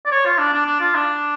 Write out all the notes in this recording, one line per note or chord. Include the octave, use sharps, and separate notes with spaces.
D5
C#5
F4
D4
D4
D4
F4
D4